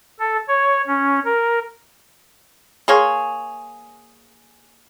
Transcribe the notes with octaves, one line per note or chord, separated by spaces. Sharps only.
A4
C#5
C#4
A#4
A#3 G#4 C#5 C6